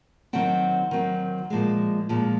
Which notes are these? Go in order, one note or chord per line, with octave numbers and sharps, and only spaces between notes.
D#3 F#3 C4 F#5
D#3 F#3 C4
A#2 F3 G#3
A#2 F3 G#3